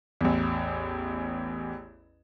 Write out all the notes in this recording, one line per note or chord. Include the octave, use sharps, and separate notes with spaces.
A1 E2